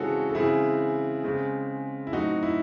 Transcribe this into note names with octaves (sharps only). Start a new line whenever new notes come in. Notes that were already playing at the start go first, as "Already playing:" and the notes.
Already playing: C#3 E3 G#3 C4 F#4 G#4 A4 C#5
A4
C#3 E3 G#3 C4 E4 G#4
C#3 G#3 C4
E4
A2 F#3 C4 D#4 F#4
E4